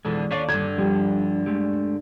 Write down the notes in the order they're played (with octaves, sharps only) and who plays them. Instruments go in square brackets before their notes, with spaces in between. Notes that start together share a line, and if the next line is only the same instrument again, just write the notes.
[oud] F2 B2 D3 [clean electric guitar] E3 G#3
[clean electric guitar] D#2 A4 D5 [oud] C#4 D4 F4
[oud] G2 D3 [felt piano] G#6
[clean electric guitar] F3 [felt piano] G3
[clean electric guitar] G#3 A3 G4